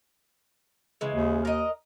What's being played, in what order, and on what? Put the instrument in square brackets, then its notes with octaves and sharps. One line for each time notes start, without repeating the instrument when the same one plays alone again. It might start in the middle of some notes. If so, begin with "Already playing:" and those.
[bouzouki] C#3 E3 G#3
[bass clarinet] D#2
[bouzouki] A#4 D#5